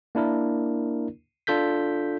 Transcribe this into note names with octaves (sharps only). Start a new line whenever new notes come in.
A#3 D4 E4 A#4
D4 F4 A4 G6 B6